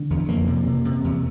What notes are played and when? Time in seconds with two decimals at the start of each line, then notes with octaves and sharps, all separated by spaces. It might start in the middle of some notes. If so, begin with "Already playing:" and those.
Already playing: D3
0.10 E2
0.28 F2 A#3
0.47 C3
0.67 C3
0.85 C3
1.04 E2